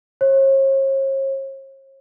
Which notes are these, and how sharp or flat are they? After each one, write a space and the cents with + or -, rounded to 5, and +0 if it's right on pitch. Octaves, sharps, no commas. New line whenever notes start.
C#5 -45